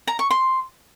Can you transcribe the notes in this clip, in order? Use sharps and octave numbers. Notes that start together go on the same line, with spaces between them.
A#5
C#6
C6